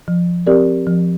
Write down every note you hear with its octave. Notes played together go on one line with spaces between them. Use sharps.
F3
C4 G4 A#4 D5
F3